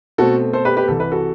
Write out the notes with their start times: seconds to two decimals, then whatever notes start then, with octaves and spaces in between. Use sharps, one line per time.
0.18 B2 A3 C4 F#4 A4
0.53 A4 C5
0.65 G4 B4
0.77 G4 B4
0.88 C2 C3 E3 A4
1.00 B4
1.12 F#4 A4